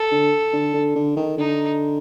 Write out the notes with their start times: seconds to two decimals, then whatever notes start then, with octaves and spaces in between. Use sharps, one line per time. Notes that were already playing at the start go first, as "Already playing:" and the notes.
Already playing: A4
0.11 D3
0.53 D3
0.74 D3
0.95 D3
1.16 D#3
1.37 D3 D#4